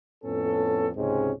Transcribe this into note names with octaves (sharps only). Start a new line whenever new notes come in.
F2 A2 B3 C#4 A4
C#2 G#2 C3 G#3 C4 C#4